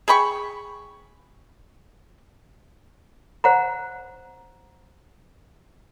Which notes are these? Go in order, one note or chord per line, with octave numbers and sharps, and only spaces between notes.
G#4 G5 B5 C#6
C5 F#5 A#5